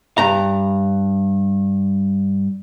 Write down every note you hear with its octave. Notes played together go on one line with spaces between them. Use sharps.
G2 A#5